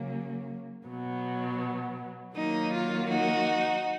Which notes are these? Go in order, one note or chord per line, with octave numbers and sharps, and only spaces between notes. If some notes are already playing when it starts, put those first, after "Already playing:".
Already playing: C#3 F#3 A#3
B2 F#3 B3
D#3 F#3 A#3 D#4
F4
D#4 F#4